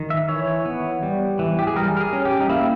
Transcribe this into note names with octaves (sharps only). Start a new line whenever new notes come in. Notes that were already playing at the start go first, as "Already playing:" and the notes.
Already playing: D#3
E5
E3 C#5
B3
G3
E3
G4
G#4
G3 A#4
A#4
G#4
C#4
G4
D#4
A#3 E4